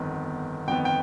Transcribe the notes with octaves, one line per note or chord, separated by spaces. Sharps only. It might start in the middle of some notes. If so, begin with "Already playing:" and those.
Already playing: G1 F2 D#3 B3
G1 F2 D#3 B3 G5
G5